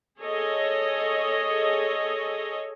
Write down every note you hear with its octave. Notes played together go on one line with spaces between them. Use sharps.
G#4 A4 C#5 D#5